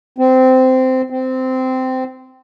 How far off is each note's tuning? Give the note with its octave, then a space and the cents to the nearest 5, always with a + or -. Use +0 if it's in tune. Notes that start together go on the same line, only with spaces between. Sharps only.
C4 -15
C4 -15